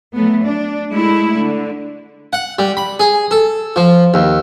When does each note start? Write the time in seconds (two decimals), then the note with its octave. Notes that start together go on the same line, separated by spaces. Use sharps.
0.14 F#3 A3 B3
0.45 D4
0.91 G#3 A3 E4
1.36 D3
2.33 F#5
2.59 G3
2.77 B5
3.00 G#4
3.31 A4
3.76 F3
4.14 D#2